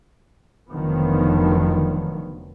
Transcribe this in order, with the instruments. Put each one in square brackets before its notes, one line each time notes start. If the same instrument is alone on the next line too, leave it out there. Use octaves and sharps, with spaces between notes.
[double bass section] F1 D3 D#3 F3 F#3 B3